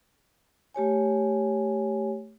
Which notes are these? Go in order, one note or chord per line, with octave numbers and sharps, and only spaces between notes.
A3 G4 C#5 G#5